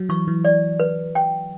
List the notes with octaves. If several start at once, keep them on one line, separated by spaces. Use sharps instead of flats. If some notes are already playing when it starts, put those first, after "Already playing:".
Already playing: F#3
E3 C#6
E3
D5
B4
G5